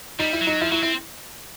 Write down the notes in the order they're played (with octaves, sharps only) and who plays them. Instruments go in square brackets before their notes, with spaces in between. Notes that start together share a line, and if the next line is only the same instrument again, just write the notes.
[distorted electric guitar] G3 [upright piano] D#4
[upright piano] E4
[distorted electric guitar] F#3
[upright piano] D#4
[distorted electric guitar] F3 [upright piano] E4
[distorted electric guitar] F#3 [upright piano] E4
[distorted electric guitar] C4 [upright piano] E4